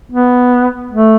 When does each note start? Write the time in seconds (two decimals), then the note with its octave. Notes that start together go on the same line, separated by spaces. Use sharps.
0.12 B3
0.91 A3